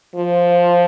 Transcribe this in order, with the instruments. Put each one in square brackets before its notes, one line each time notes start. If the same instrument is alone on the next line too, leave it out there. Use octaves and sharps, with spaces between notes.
[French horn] F3